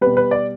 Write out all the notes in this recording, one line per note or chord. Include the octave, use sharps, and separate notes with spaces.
B2 G3 B4
B4
D5